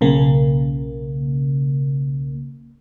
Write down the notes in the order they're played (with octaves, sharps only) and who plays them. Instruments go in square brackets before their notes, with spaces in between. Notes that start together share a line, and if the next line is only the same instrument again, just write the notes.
[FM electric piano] B1 C#3 A#3